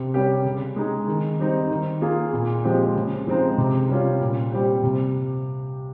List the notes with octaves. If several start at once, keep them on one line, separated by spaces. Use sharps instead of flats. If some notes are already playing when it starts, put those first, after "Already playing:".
Already playing: C3
G3 C#4 G4
C#3
G#3 D#4 G#4
D#3
G3 C4 D#4
D#3
A#3 F4 G#4
A#2
F3 G#3 C4 G4
C#3
F3 G#3 C4 D#4
C3
G3 C#4 F4
A#2
G3 C4 G4
C3